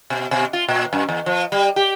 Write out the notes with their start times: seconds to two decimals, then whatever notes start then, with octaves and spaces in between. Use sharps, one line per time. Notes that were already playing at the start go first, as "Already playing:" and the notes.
0.10 B2
0.31 B2
0.53 F4
0.68 A#2
0.93 F#2
1.09 E2
1.26 F3
1.52 G3
1.76 G4